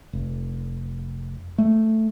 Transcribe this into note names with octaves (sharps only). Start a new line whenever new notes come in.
F1
A3